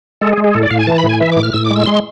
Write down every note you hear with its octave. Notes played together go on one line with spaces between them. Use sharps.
G#3 A4
G#4
G#3
G#4
A2 A4
D5
A2 F5
G#5
E3 A5
B5
A2
G#5
E3 E5
A2 D6
F6
A2 E6
D6
G#3
E6
G#3 C6